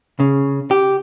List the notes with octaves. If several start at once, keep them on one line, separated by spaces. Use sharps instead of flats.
C#3
G4